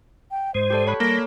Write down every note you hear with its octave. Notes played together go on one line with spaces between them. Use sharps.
G5
G#2 G#3 C5
G4 A4 D5
C#5 B5 F#6
G3 A#3 A#6